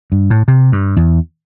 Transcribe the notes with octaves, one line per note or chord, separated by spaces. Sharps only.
G2
A2
C3
G2
E2